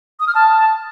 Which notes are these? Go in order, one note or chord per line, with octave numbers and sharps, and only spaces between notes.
D#6
F6
A5